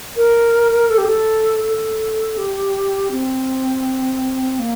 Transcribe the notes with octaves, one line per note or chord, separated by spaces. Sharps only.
A#4
A4
G4
A4
A4
G4
C4
A#3